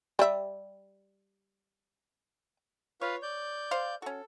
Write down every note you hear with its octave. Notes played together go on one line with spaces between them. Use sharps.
G3 E5
F4 B4 C#5 F5
D5 G6
C5 F5
C#4 F#4 A4